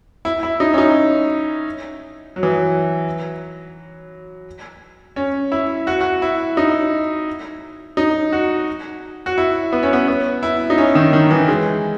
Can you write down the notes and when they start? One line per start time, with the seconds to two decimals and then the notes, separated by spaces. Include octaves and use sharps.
0.25 E4
0.43 E4
0.60 D#4
0.74 C#4
0.78 D#4
2.36 F#3
2.43 E3
2.50 F#3
5.16 C#4
5.52 E4
5.87 F#4
6.01 F#4
6.22 E4
6.57 D#4
7.97 D#4
8.32 F#4
9.26 F#4
9.38 E4
9.73 B3
9.83 C#4
9.93 B3
10.08 B3
10.43 E4
10.70 D#4
10.78 C#4
10.95 D#3
11.13 D#3
11.31 E3
11.48 G#3